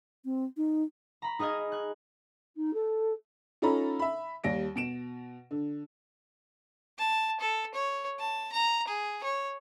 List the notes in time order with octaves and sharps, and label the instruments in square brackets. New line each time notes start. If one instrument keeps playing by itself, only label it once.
[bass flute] C4
D#4
[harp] A#5 B5
D#4 G#4 D#5 F6 G#6
F#6 G#6
[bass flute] D#4
A4
[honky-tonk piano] C#4 D#4 F4 A4 A#5 B5
E5 B5
D#2 G3 A#6 D7
B2 D7 E7
D3
[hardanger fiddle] A5
A4
C#5
A5
A#5
G#4
C#5